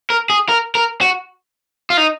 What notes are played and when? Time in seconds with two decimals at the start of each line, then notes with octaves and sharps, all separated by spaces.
0.10 A#4
0.30 G#4
0.49 A#4
0.75 A#4
1.01 F#4
1.90 F4
1.97 D#4